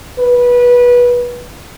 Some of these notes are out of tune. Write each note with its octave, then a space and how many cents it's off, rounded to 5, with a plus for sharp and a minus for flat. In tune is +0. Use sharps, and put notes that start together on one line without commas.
B4 -20